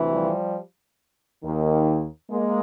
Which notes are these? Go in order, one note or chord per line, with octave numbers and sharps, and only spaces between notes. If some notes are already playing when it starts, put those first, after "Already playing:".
Already playing: D2 C3 E3
F3 G3
D#2 D#3
G#3 A#3